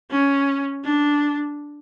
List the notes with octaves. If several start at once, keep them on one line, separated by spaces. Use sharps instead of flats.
C#4
D4